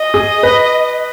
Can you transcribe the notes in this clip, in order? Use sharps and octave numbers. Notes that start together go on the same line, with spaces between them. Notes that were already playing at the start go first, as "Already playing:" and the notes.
Already playing: D#5
G#4
B4